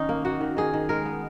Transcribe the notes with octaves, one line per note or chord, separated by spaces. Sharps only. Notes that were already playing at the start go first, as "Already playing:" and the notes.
Already playing: D#3 C#4 D#4
A#3
A#3 F#4
D#3
D#3 G#4
D#3
G#3 A#4
B3